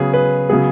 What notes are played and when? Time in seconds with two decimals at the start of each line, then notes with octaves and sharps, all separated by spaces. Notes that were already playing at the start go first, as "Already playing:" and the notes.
Already playing: C#3 F#3 B3 G#4
0.14 B4
0.49 C#3 F#3 B3 G#4